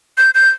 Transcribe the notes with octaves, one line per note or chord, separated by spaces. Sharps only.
G6
G6